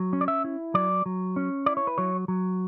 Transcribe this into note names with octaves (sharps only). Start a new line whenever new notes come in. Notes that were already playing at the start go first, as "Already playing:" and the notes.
Already playing: F#3
C#4
D5
E5
E4
F#3 D5
F#3
C#4
E4 D5
C#5
B4
F#3 C#5
F#3